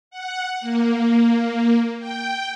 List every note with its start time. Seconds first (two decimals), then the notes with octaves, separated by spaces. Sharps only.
0.11 F#5
0.61 A#3
1.99 G5